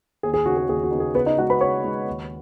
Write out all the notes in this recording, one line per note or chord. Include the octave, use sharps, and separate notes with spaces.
D#2 G#4
G#4
C#3 B3 D#4 F#4
G#4
D#2 G#4
F#4
C#3 B3 D#4
G#4
C#3 B3 B4
D#4 D#5
G#3 D#4 F#4 F#5
B4 B5
C#3 C#5 C#6
G#3 D#4
D#2